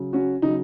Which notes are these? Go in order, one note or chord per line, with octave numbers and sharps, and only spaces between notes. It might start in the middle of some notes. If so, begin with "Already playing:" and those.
Already playing: C#3 F#3
C#4 F#4
C#3 F#3 D#4